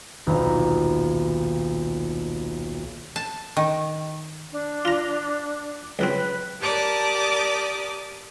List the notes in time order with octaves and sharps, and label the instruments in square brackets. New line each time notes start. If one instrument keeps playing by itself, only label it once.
[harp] D#1 B1 A#5
[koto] A5
D#3
[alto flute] D4
[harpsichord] F4 A#5
[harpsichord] C#2 F#3 C4 [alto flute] B4
[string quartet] G4 A#4 D5 A5 D6 D#6